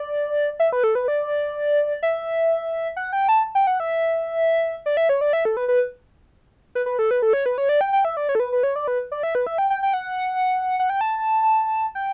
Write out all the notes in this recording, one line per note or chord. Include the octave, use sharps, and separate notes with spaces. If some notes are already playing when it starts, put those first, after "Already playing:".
Already playing: D5
E5
B4
A4
B4
D5
E5
F#5
G5
A5
G5
F#5
E5
D5
E5
C#5
D5
E5
A4
B4
B4
B4
B4
A4
B4
A4
C#5
B4
C#5
D5
G5
G5
E5
D5
C#5
A4
B4
B4
C#5
D5
B4
D5
E5
B4
E5
G5
G5
G5
F#5
F#5
G5
A5
G5